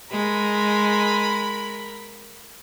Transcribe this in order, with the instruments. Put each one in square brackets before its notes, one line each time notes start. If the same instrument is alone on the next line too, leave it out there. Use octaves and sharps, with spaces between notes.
[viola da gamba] G#3 [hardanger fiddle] A#4 B5